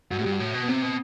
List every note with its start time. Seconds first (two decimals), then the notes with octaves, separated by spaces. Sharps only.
0.10 G2 F#4
0.18 A2
0.22 G2 G4
0.31 F#4
0.40 A2
0.54 B2
0.62 B3
0.68 C3 C4
0.82 B2